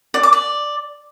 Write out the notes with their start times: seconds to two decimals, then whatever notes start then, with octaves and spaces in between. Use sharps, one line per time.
0.14 D5
0.23 D6
0.33 D5